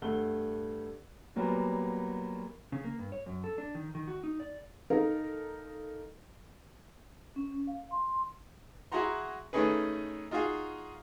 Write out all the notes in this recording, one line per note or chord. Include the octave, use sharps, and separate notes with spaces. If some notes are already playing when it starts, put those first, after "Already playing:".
G2 A3 F#5 G7
A#2 F#3 G3 A#3 B3
C#3
A#3
G2
C#5
F#2
A4
D4
D#3
D#3
F#4
D#4
D5
D#4 A4 A#4 F5
C#4
F5
C6
E4 F#4 G#4 F#5 A#5 C6
D#3 A3 C#4 D#4 G#4 B4
D#4 F4 F#4 G#4 F5